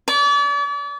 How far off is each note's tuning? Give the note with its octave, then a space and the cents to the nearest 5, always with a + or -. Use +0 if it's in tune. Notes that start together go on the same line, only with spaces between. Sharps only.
D5 -40